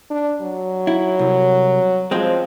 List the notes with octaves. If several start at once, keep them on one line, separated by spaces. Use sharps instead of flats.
D4
F#3
E4
C2
F3 G#3 C4